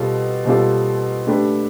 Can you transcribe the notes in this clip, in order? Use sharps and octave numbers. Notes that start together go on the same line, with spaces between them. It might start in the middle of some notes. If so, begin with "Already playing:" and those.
Already playing: B2 G3 C4 F4 A4
B2 G3 C4 F4 A4
A3 D4 G4 B4